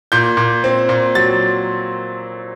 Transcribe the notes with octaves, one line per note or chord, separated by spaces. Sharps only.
A#2 G6
A#2
C4
A#2
F#3 A6